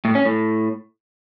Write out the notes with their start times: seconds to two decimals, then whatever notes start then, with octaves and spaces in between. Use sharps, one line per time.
0.05 A2
0.15 C#4
0.25 A2